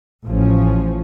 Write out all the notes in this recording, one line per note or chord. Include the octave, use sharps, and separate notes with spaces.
A1 F3 C#4